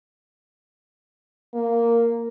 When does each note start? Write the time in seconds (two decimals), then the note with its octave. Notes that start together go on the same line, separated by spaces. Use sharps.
1.54 A#3